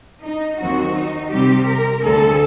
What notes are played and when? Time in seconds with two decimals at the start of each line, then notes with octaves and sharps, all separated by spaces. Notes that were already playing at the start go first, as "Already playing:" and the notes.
0.25 D#4
0.61 D#2 D#3 F#3 C4 F#4
0.96 D#4
1.32 C3 G3 C4 G4
1.68 A#4
2.04 D2 D3 G3 A4